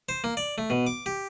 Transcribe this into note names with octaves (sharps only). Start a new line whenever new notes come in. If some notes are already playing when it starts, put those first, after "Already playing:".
C5
A#3
D5
A3
B2
D6
G4